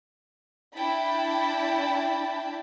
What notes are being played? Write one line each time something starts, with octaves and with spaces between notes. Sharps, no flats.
D4 E4 G5 A5 B5